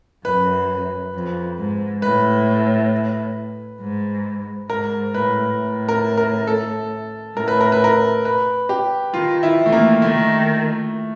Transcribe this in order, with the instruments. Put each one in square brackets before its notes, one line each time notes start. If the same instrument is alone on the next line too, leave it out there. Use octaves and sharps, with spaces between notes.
[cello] F#2 [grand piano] B4
[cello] F2
G#2
[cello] A2 [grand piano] B4
[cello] G#2
[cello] G#2 [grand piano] A#4
[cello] A2 [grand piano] B4
[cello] A2
[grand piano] A#4
A#4
A4
[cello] A2 [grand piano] A#4
[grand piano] B4
A#4
B4
A#4
B4
G4
[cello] D#3 [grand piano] F4
[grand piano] E4
[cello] E3
[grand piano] A3
A#3
[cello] D#3 [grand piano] A3